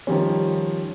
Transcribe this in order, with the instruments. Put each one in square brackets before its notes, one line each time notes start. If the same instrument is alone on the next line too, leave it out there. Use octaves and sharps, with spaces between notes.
[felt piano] D#3 F3 G3 C#4